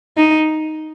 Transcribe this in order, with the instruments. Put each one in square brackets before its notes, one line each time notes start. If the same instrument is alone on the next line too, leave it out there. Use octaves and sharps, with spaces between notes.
[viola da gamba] D#4